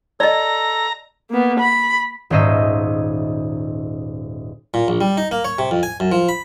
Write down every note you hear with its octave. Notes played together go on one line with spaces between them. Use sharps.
A4 D5 D#5 A#5
A#3 B3
B5
D#1 G#2 C#4 C5 D#5 E5
A#2
A#1
G3
D#4
A#3
C#5
C3
F2
G#5
F#2
F3
B5